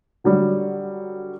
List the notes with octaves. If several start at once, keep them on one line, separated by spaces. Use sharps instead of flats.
D3 F#3 G3